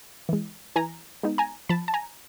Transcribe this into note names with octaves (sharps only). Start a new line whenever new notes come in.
E3 G#3
E3 G#5 A#5
G#3 B3 D#4
G#5 A#5
F3 A5 B5
A5
G#5 A#5